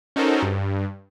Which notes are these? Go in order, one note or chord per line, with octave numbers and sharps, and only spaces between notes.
C#4 D#4 F#4 A4 A#4 C5
G2